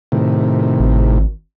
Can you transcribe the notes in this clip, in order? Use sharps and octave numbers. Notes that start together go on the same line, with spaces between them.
A2 C3 D#3
G#1